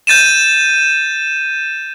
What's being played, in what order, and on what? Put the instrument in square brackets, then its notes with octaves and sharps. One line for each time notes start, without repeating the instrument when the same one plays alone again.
[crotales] G6 A6 D#7 E7